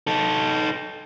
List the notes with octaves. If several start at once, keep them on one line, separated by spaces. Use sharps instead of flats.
D#4 A4